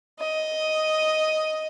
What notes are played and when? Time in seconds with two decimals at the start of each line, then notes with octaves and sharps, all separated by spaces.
0.20 D#5